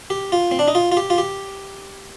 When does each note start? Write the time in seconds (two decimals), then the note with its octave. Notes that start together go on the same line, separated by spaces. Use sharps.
0.10 G4
0.32 F4
0.51 C4
0.59 D4
0.68 D#4
0.75 F4
0.92 F4
0.97 G4
1.10 F4
1.18 G4